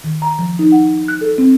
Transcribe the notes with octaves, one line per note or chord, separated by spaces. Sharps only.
D#3
A#5
F3
D#4
F#5
F#6
A4
C4